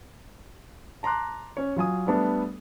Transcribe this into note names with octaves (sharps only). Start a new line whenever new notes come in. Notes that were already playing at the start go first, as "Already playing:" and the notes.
A5 A#5 C6 D6 F#6
C#4 C#5
F#3 F4 G#5 D#6
G3 A3 B3 D4 A4